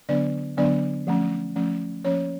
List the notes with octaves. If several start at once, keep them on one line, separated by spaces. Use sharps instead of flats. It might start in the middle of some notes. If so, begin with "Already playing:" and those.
D3 F#3 B3 D4 D5
D3 F#3 B3 D4 D5
F3 A3 C#4
F3 A3 C#4
F3 A#3 C#4 C#5